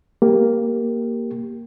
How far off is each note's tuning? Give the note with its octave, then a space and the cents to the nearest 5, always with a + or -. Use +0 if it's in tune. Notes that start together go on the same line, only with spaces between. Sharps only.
A#3 +0 G4 +0